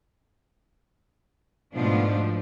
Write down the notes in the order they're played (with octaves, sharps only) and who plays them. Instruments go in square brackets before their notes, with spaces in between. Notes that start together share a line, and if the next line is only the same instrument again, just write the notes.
[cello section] G#2 B2 F3 A3 B3 D4